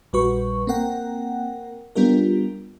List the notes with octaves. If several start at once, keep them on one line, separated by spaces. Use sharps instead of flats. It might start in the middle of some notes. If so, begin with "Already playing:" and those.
A#1 G3 F#4 B4 C#6
A#3 C4 A#4 F#5 G5
G3 B3 D4 F4 G4 A#4